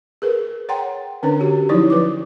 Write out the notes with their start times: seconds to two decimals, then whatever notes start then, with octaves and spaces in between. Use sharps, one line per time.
0.22 G#4 A#4 B4
0.69 C#5 F#5 G5 A#5 C6
1.23 D3 C#4 D4 B4 C#5
1.40 F#4 G4
1.69 F3 F#3 D#4 E4 C#5 D5
1.90 F3 B4 D6